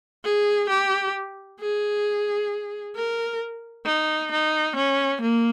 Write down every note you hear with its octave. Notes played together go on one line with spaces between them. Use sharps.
G#4
G4
G#4
A#4
D#4
D#4
C#4
A#3